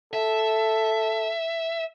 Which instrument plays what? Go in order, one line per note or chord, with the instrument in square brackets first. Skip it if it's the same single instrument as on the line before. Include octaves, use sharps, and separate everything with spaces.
[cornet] A4 [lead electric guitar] E5